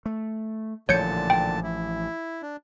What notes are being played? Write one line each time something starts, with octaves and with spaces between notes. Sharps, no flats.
A3
A1 A#2 D3 F3 C#5 A5 G6 C#7
G5
E4
D4